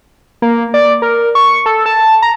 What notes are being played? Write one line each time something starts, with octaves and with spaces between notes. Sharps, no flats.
A#3
D5
A#4
C#6
A4
A5
A#5